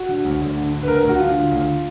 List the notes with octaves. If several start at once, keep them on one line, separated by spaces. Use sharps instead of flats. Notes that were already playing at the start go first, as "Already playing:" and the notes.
Already playing: F#4
D3
D2
D2
D3
D3
B4
D2 A#4
D2 A#4
F#4
D3 F4
D3
D2